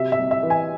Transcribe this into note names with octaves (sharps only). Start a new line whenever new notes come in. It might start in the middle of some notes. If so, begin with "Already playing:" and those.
Already playing: C3 F#3 E5
E5
C2
E5
E3
G#5